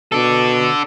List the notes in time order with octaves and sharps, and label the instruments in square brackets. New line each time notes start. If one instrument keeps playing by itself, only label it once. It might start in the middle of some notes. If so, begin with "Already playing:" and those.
[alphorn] B2 [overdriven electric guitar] D4 A4